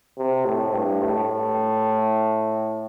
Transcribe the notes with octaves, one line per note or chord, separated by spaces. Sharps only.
C3
A2
G2
A2